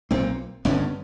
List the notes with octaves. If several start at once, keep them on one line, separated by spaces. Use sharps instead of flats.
B1 A#2 A#3 C4
G1 G2 D3 B3 C#4